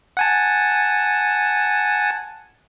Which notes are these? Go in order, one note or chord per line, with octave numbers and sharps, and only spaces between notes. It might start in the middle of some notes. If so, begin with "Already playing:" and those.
F#5 G#5 A5